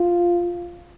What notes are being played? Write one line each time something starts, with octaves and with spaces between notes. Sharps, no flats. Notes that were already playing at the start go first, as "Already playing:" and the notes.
Already playing: F4